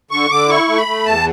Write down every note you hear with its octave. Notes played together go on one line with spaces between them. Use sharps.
D3 C#6
D3 D6
E4 C#6
A3
B5
A3
E2 A5